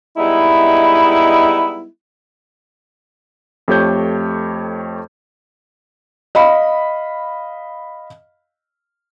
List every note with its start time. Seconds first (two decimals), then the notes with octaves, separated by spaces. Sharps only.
0.17 G3 G#3 B3 D#4 E4
3.68 F2 A3 G4 C#5 G6
6.35 D#5 F5 B5